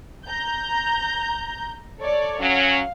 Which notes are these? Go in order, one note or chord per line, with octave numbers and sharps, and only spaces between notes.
A#5 G6
A4 C#5 D5
F#3 C#4 F5